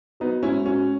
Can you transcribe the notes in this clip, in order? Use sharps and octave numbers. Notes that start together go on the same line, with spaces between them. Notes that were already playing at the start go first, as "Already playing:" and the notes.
F#3 B3 D#4
G#2 C#4 E4
F#3 C#4